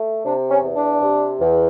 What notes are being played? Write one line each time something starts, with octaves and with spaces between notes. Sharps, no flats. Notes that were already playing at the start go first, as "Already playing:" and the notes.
Already playing: A3
C3 D4
C#4
E2
D4
C3
E2